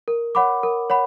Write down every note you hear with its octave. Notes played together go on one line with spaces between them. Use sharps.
A#4
C#5 F#5 B5 D6
A#4
C#5 F#5 B5